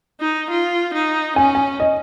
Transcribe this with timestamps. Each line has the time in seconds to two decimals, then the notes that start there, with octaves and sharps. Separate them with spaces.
0.21 D#4
0.51 F4
0.94 D#4
1.36 C#4 G#5
1.55 G#5
1.80 D#5